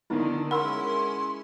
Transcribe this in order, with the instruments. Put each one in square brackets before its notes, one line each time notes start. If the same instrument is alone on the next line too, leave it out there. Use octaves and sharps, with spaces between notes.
[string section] D3 D#3 [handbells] B3 D#4 E4
[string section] G#3 C#4 E4 [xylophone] A#4 [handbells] F#5 B5 E6 [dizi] C6